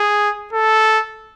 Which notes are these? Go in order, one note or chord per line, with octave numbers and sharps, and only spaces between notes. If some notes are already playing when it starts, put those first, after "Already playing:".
Already playing: G#4
A4